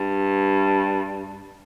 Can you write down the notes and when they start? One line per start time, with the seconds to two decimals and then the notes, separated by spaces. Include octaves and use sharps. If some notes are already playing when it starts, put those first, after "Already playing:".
Already playing: G2